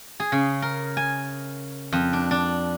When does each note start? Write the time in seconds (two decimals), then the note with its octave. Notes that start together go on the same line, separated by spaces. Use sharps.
0.20 G#4
0.32 C#3
0.62 A#4
0.97 G#5
1.93 F2
2.13 D4
2.31 D4